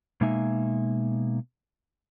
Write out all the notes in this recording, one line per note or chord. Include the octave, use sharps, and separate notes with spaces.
B2 G#3 A#3 D#4 E5 G#5